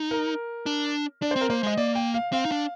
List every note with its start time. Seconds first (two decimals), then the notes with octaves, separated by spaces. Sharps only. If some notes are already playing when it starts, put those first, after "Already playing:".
Already playing: D#4
0.11 A#4
0.66 D4
1.22 D4 D5
1.31 C5
1.36 C4
1.41 A#4
1.50 A#3 C5
1.63 G#3 D#5
1.77 A#3 D5
1.95 G5
2.14 F5
2.33 C4 F5
2.45 D#4
2.52 D4